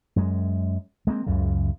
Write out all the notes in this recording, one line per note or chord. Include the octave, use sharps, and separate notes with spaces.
F#2 G#3
G#3 A#3 C4
C#2 F#2 C#3